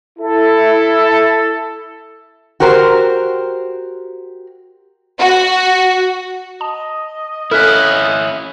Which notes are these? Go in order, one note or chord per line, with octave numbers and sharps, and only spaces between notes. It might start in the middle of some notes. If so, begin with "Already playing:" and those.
E4 A4
F#4 G4 A#4 C5
F#4
D#5 A5
C#4 E4 A4 F6 F#6 B6